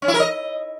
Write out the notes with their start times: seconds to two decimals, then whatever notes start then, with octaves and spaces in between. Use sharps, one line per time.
0.02 C#4
0.08 E4
0.14 A#4
0.20 D#5